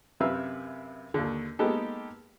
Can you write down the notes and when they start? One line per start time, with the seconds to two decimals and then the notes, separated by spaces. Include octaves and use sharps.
0.20 F#2 C3 B4 E5 F5 E6
1.14 D#2 D3
1.59 G#3 A#3 B3 D#4 G4 A4